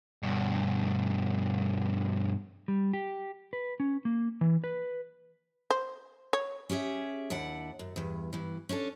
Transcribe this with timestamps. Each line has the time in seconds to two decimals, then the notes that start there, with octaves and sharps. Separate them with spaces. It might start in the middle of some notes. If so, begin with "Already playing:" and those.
0.23 G2 B2
2.68 G3
2.93 G4
3.53 B4
3.80 C#4
4.05 A#3
4.41 E3
4.64 B4
5.71 C5
6.33 C#5
6.69 C#4 G4 G#4 E5
7.30 D#2 D4 E4 F#5
7.79 F#2
7.96 E2 G2
8.33 G2 E3
8.69 C#4 D4 G4 A4